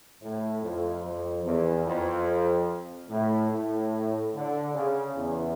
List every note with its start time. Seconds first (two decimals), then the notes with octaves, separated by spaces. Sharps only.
0.21 A2
0.61 F2
1.03 F2
1.44 E2
1.85 F2
3.08 A2
3.50 A2
4.33 D3
4.74 C#3
5.15 E2